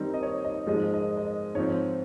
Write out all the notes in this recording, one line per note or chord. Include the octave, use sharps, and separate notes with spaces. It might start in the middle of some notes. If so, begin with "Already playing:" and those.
Already playing: D#3 G3 C4 D#4
D#5
C#5
D#5
G#2 F3 G#3 D#5
D#5
D#5
G#2 F3 C4 C#5